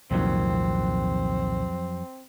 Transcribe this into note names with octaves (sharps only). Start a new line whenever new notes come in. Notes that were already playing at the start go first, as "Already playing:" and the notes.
C2 F2 A#2 D#3 F#3 C4